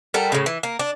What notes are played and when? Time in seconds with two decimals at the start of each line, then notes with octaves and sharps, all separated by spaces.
0.14 G3 A4 A#4 F#5
0.32 A2 C#3
0.46 E3
0.63 A#3
0.79 D4